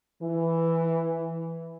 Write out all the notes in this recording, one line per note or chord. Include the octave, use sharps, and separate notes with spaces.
E3